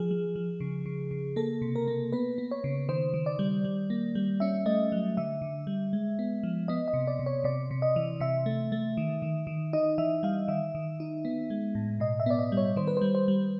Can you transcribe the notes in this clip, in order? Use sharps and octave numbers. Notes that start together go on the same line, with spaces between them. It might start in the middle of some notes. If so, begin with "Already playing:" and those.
Already playing: F3 G#4
F3
F3
C#3
C#3
C#3
A#3 A4
C3
A#4
A#3
B3 B4
B3
C#5
C#3
D#3 C5
D#3
D5
G3
G3
A#3
G3
C#4 E5
A3 D#5
F#3
D3 E5
D3
G3
G#3
B3
F3
B3 D#5
D#5
C3
D5
C3
C#5
C3 D5
C3
D#5
E3
C3 E5
A3
A3
D#3
D#3
D#3
D#4 D#5
E3 E5
G3 F5
D#3 E5
D#3
D#4
B3
G#3
A2
B2 D#5
E5
B3 D5
D#5
G3
C#5
D#3 C5
B4
G3 C5
C5
G3